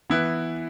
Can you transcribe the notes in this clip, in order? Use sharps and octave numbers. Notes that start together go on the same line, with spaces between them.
E3 B3 E4 B4